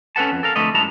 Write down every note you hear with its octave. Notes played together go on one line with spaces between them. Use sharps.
C#4 A4 B4 F#5 A5
F2
A4 A#4 F5
F2 D3 A3 A4 B4 D#5
F#2 G#3 B3 E4 A5 A#5